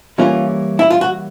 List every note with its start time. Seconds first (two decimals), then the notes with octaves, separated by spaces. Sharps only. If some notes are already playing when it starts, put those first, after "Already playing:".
0.18 E3 G3 A#3 C#4 F4
0.79 E4
0.90 F4
1.01 F#4